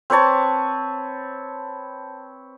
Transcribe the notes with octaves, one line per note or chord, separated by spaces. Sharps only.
C4 B4 C#5 A5